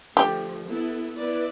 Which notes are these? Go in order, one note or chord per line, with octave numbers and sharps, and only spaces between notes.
D3 F3 A3 G4
B3 E4 A4
B3 E4 B4 D5